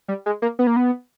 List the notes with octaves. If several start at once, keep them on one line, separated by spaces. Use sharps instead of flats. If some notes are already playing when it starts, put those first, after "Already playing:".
G3
G#3
A#3
B3
A#3
B3